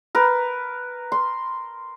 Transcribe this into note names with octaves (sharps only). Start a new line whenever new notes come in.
A#4 B4
C6